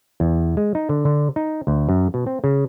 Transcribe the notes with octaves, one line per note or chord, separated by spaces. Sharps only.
E2
G#3
D#4
D3
D3
D#4
D2
F#2
B2
C4
C#3